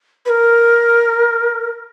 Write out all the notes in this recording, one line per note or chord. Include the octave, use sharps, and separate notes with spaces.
B4
A#4